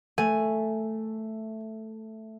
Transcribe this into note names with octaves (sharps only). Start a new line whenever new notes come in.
A3 G#5